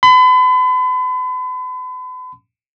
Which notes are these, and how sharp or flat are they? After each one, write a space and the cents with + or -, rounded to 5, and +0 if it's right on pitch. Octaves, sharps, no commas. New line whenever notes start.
B5 +40